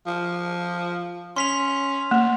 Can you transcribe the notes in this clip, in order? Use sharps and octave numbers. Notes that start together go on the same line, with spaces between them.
F3
C#4 C6 B6 F7
A#3